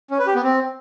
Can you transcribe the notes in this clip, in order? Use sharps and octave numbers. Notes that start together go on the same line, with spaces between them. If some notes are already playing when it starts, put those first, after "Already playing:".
C#4
B4
G4
B3
C4